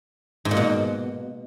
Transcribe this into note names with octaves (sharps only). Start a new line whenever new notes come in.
G#2
A#2
B2